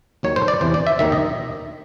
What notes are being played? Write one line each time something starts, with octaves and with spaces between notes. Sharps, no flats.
D#2 D#3 F#3 C#5
C5
D5
E2 C3 E3 C5
D5
E5
D#2 D#3 F#3 E5
D#5